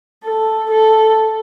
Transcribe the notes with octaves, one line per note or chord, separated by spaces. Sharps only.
A4
A4